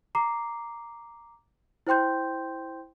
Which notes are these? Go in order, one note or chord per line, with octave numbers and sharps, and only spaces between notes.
A#5 D6 C7
E4 C5 G5 C6 G6